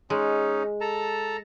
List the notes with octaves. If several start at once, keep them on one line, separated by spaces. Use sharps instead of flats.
G#3 C#4 D#4
A4 A5 A#5